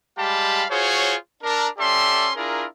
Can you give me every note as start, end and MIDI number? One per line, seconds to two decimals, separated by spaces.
0.17 0.64 55
0.17 0.64 56
0.17 0.64 67
0.17 0.64 77
0.17 0.64 81
0.17 0.64 83
0.70 1.14 65
0.70 1.14 66
0.70 1.14 68
0.70 1.14 72
0.70 1.14 73
1.42 1.67 62
1.42 1.67 70
1.78 2.29 61
1.78 2.29 67
1.78 2.29 69
1.78 2.29 74
1.78 2.29 76
1.78 2.29 84
2.36 2.64 62
2.36 2.64 64
2.36 2.64 65
2.36 2.64 68
2.36 2.64 70